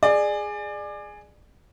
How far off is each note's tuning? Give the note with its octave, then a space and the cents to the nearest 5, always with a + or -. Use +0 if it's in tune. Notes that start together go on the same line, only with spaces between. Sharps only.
G#4 +0 D5 +25